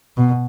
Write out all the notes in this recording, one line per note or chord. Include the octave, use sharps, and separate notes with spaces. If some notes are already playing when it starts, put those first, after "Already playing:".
B2